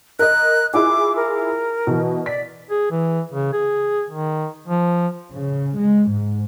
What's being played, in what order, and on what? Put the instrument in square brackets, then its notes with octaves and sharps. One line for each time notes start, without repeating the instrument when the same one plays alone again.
[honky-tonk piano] A#4 D#5 [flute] F#6
[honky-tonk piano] E4 F4 G#4 [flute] D6
[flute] A#4
[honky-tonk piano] B2 E3
[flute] D5 [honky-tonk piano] B6
[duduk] G#4
E3
C#3
G#4
D#3
F3
[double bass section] C#3
G#3
G#2